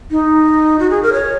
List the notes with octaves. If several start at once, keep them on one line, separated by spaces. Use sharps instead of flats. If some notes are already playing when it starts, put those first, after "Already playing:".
D#4
F#4
G#4
A#4
C#5